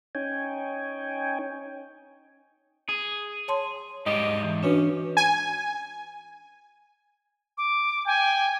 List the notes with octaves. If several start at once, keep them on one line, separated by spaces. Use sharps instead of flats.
C#4 D#4 C#5 G5 G#5
G#4
C#5 A5 C6
G#2 G3 G4 D#5
E3
C#4 D4 F#4 B4
G#5
D6
G5 G#5